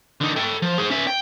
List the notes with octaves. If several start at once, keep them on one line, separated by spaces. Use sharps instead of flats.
D3 D#4
A4 G5
F3
G#4 C5
C#4 E5
G5